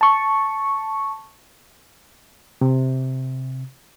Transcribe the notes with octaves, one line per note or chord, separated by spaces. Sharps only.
A5 C#6
C3